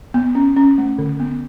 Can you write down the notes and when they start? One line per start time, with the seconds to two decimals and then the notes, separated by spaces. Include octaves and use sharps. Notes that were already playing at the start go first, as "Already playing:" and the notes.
0.14 B3
0.35 C#4
0.56 C#4
0.78 A3
0.98 D3
1.20 B3